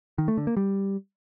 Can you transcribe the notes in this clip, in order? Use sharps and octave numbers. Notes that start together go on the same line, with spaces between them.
D#3
A3
D3
A#3
G3